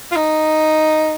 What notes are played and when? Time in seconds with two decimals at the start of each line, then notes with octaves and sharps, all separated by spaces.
0.11 F4
0.16 D#4